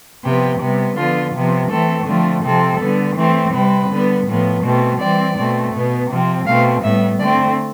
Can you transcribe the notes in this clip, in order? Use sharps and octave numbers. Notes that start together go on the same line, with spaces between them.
C3 F3 B3 G4
C3 G3 B3
D3 F3 B3 F4
C3 F3 B3
E3 A3 C4 A4
D3 F3 A3 C4
C3 F3 C4 A4
D3 G3 B3
E3 A3 C4
C3 G3 C4 B4
D3 G3 B3
A2 F3 B3
B2 A3 C4
E3 G3 C4 D5
B2 A3 C4
B2 B3
C3 F3 C4
B2 A3 C4 F5
A2 G3 B3 E5
D3 A3 C4 D5